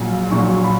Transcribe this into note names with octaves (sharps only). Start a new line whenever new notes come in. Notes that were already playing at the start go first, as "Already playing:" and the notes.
Already playing: A#1 A#2 F#3
A#1 A#2 F#3 C#6
B5